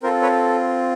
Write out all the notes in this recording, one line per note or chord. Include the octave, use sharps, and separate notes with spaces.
C4 F4 A4 A#4 C5
B4 C#5